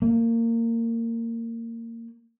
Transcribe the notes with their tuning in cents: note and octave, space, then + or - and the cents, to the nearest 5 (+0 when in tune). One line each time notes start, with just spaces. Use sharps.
A#3 -20